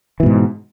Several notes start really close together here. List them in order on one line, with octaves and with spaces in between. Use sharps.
E3 B2 G#2